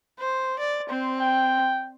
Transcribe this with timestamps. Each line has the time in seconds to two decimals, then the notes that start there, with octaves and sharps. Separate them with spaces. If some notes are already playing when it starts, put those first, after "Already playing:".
0.20 C5
0.60 D5
0.89 C4 C5
1.20 G5